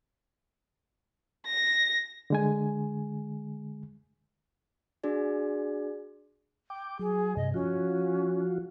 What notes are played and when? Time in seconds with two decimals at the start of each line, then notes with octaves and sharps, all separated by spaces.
1.46 A#6
2.30 D3 G#3 G#5
5.04 D4 F#4 G#4 D5
6.70 G5 D6
6.99 F#3 G#4
7.37 G2 C3 D#5
7.54 F3 C#4 F4 F#4